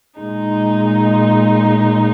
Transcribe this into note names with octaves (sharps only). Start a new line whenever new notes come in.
A#2 G#3 D#4